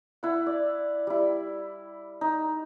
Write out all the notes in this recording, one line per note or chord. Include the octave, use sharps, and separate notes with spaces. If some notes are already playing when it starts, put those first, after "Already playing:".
E4 F#5
D5
G3 E4
D#4